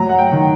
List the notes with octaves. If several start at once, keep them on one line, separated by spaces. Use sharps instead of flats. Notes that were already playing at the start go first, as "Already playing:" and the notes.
Already playing: F#3 A#5
F#5
G5
D#3